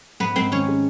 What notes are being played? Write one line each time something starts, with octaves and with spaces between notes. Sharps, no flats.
G#2 B3 B4
G#2 C4 C5
D#3 C#4 C#5
G#3